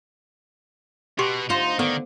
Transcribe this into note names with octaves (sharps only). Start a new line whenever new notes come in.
B2 G4 C6 C#6
D2 D#4 F4 C5
D3 D#3 B3